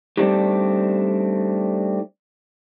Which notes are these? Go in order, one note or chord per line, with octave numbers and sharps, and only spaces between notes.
G3 A3 C4 D4 D#4 G4